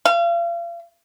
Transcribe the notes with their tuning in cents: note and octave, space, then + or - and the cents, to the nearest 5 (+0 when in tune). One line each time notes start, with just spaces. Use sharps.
F5 -40